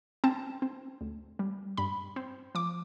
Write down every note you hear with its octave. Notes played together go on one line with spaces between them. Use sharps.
C4 A5
C4
D2
G3
G2 B5
C4
F3 D6